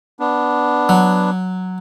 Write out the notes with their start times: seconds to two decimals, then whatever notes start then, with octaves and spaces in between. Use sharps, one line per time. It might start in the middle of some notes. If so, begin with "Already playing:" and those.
0.20 B3 D4
0.89 F#3